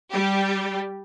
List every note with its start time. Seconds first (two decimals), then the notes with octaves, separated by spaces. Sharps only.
0.11 G3 G4